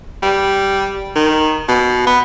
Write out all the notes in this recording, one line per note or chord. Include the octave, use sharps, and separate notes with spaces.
G3
D#3
B2
B3